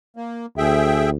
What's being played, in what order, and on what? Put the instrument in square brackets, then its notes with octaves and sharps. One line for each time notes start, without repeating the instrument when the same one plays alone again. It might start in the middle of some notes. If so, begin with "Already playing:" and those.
[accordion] A#3
[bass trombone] D2 [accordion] G#4 E5 G5